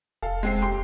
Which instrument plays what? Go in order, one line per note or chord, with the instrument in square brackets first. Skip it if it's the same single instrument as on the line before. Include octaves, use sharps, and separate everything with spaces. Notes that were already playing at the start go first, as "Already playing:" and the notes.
[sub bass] F1 [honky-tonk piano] A4 F5
[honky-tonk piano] G#3 C4 C7
[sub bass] F1 [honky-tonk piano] G4 C6